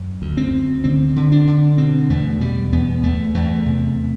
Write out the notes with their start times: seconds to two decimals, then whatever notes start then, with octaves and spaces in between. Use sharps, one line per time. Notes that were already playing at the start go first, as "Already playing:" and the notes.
Already playing: F#2
0.22 D2
0.37 C4
0.53 D2
0.84 D3 C4
1.16 D3
1.32 D4
1.47 D3
1.78 B2 C4
2.10 E2 A3
2.41 B2 G3
2.72 E2 B3
3.03 E2 A3
3.34 E2 A3
3.66 C3